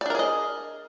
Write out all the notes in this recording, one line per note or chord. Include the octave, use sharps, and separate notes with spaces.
D4 G#4 A#4 D5 D#5